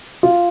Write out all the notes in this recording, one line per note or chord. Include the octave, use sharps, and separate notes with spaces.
F4